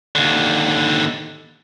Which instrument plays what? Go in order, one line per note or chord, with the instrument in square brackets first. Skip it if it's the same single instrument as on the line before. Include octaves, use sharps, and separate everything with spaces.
[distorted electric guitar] D#2 D3